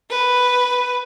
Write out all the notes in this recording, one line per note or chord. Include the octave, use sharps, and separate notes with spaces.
B4